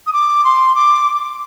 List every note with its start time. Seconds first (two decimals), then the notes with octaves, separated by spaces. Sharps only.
0.07 D#6
0.13 D6
0.44 C6
0.75 D6